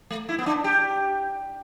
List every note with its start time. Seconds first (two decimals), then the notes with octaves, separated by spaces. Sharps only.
0.11 A3
0.29 E4
0.39 B3
0.46 D4
0.64 G4